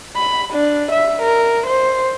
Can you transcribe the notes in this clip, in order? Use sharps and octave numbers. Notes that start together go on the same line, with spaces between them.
B5
D4
E5
A#4
C5